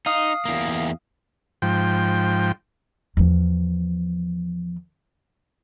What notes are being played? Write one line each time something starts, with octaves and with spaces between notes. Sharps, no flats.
D#4 F5 D#6
E2 A#3
G#2 F3 G5
E2 F3